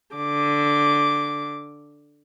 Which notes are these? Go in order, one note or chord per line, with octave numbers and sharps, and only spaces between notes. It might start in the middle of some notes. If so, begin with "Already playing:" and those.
D3 D6